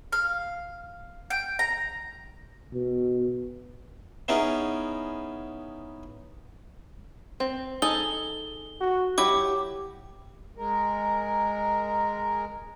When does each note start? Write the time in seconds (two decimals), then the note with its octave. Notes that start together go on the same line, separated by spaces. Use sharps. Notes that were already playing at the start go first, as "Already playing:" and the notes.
0.13 F5
1.30 G5
1.59 A#5
2.73 B2
4.28 B3 C#4 D#4 E4 G#4 A#4
7.40 C4
7.82 D#4 G#4 A4 G7
8.81 F#4
9.18 F#3 E4 G4 B5 D6
10.57 G#3 A#4